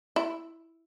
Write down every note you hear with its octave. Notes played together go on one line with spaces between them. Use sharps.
E4